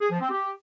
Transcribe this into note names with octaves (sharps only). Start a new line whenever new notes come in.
G#4
F3
C4
G4